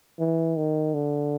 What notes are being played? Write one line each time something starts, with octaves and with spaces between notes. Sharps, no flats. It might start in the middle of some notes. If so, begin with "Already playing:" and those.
E3
D#3
D3